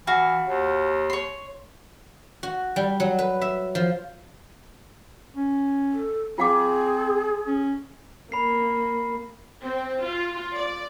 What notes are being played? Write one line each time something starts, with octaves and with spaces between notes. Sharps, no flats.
E3 F#4 F5
D#2
C#5 C6
F#4
G3
F#3
B4
E5
F3
C#4
A4
C4 F4 G#4 F5 D6
C#4
A#3 B5 C7
C4
F4
D5